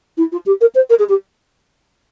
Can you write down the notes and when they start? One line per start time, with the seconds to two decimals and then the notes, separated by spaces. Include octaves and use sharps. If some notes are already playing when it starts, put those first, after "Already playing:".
0.17 E4
0.32 F4
0.46 G4
0.61 A#4
0.75 C5
0.89 A#4
0.99 G#4
1.09 G4